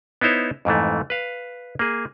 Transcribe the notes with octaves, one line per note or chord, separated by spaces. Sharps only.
B3 D#4 E4 C5 C#5
F2 G#2 E3 A3
B4 F5
A#3 G#4